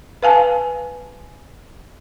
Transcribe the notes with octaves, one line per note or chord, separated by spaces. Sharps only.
B4 F5 G#5 A5